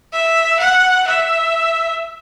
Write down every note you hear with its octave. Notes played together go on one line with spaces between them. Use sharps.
E5
F#5
E5